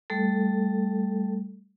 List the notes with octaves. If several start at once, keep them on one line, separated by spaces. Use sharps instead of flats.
G3 A3 A4